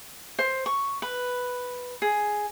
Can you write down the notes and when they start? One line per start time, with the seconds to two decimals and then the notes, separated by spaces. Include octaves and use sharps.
0.39 C5
0.66 C#6
1.02 B4
2.02 G#4